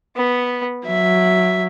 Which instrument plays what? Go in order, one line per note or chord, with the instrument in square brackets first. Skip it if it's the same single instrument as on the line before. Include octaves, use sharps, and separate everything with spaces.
[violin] B3
[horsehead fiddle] F#3 [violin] E5